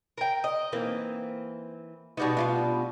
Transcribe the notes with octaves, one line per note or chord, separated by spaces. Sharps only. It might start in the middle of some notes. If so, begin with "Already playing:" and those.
A#4 G5
D#5
E3 A#3 C4 D#4
B2 G3 B3 D#4 F#4
D4 E4 F4